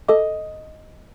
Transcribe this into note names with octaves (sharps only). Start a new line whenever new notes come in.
A4 D#5 D6